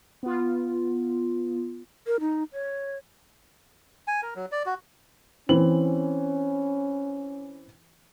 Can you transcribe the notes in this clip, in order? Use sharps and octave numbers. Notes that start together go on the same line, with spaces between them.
B3 F4
A#4
D#4
C#5
G#5
A#4
F#3
D5
F#4
E3 C4 C#4 F#7